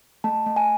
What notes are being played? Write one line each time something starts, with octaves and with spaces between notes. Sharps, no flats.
A3 A5
A3
G#5